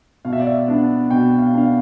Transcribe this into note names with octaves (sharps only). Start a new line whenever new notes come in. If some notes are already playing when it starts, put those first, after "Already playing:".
B2 F5
E5
D5
E5
B3 D4
B2 G5
F5
B3 D4 F5